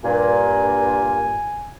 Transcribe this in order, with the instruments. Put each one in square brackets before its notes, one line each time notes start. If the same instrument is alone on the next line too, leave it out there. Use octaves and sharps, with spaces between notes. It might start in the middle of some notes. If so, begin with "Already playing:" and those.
[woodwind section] G2 A#2 [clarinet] G#5